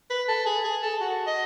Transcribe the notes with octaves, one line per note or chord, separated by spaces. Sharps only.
B4
A4
G#4
G#4
A4
F#4
D#5